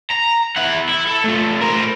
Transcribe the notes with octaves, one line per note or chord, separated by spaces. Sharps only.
A#5
E4 F#5
E4
A4
A3 F4
A#4 C5